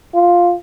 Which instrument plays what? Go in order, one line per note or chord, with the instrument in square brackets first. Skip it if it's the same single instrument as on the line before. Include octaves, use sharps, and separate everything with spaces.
[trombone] F4